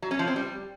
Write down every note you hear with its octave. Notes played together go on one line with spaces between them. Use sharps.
F#3
C#4
F3
C4
G3